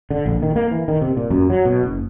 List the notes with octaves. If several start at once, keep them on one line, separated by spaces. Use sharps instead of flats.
D3
A#1
D#3
A#3
E3
D#3
C3
A#2
F#2
F#3
B2
F#1